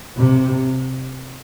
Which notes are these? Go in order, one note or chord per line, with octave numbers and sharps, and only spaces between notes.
C3